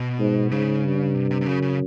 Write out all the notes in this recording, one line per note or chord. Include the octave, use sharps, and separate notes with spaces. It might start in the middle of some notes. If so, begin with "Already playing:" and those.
Already playing: B2
G#2
G#2 C#3
G2
C3
C3
C3
F#2 C#3
C#3